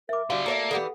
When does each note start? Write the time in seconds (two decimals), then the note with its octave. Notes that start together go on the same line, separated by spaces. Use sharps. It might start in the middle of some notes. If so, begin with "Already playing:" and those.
0.09 A#4 E5 D6
0.30 D3 G3 F#4 G4 D5 F5
0.46 A#3 A4 C#5 E5
0.71 E3 G3 B3 A4 F#5